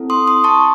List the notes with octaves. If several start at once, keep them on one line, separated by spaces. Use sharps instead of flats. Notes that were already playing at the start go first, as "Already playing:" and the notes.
Already playing: C4 E4 A4
C6 D#6
C6 D#6
A5 C#6